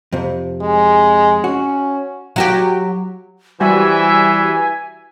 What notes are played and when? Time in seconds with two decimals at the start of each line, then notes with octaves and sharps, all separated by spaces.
0.12 F2 C3
0.61 G#3
1.44 C#4 F#4
2.36 F#3 F#4 G4
3.60 E3 G3 F#4 C5 E5 G#5